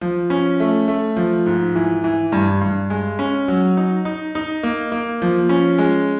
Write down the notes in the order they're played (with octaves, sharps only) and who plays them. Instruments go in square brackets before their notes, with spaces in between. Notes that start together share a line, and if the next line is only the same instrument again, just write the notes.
[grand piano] F3
C#4
A3
A3
F3
G#2
E3
E3
G2
G2
G#3
C#4
F#3
D#4
D#4
D#4
A#3
A#3
F3
C#4
G#3